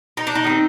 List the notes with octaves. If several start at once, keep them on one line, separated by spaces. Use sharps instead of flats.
D#4
D4
D#4
D#3 G3
C4